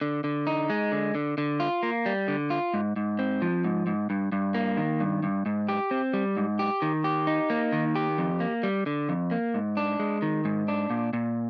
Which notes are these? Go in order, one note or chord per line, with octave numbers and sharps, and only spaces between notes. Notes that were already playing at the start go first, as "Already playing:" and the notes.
D3
D3
D#4
G#3
D3
D3
D3
F4
A#3
G3
D3
F4
G#2
G#2
C4
F3
G#2
G#2
G2
G2
A#3
D#3
G2
G2
G#2
G4
C4
G3
G#2
G4
D#3
G4
D#4
A#3
D#3
G4
F2
A#3
G3
D3
F2
A#3
G#2
D4
G#3
D#3
G#2
D4
A#2
A#2